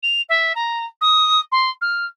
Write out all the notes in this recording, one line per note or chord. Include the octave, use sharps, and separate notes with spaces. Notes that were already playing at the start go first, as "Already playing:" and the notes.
F7
E5
A#5
D#6
C6
F6